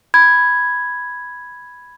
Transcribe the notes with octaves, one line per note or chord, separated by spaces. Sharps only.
B5 G#6